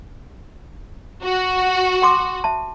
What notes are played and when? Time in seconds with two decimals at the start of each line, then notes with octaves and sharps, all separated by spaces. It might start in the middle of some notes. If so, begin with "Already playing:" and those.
1.24 F#4
2.02 G5 C6 D6
2.44 E5 A5